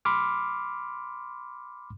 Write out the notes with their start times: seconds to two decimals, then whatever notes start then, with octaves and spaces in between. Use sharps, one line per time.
0.05 B5 C6 D6 F6